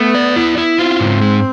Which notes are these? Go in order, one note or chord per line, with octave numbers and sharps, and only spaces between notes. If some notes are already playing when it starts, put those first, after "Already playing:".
Already playing: A3 B3
D5
E4
E4
C4 F4
G#2
G#3